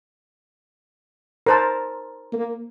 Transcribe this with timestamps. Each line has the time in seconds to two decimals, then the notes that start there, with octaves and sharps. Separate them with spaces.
1.46 A#4 C5 A5
2.33 A#3